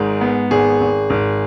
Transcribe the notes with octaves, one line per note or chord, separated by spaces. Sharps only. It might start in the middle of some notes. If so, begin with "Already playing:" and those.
Already playing: G#1 G#2 G#4
B3
G#1 G#4
G#1
G#1